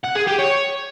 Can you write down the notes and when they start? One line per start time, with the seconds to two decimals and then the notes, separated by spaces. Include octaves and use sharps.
0.04 F#5
0.15 G#4
0.27 G4
0.39 C#5